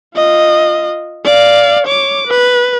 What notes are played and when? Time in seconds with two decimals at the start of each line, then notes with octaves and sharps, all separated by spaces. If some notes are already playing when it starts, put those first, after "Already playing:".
0.16 F4 D#5
1.25 D5 F5
1.87 C#5 D6
2.27 B4